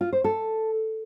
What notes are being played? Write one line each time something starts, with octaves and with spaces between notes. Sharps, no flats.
F4
C5
A4